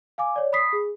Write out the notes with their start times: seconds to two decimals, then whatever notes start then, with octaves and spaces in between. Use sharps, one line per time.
0.18 F5 G#5 D6
0.36 C#5 D5
0.53 B5 D#6 B6 C7
0.73 G#4